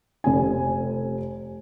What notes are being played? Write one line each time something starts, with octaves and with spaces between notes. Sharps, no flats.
F1 C3 G#5